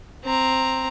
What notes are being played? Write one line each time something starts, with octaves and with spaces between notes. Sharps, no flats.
C4 A#5